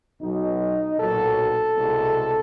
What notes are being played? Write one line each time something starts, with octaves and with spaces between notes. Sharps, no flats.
B1 B2 F#3 D#4
B1 A#2 F#3 A4
C2 B2 G#3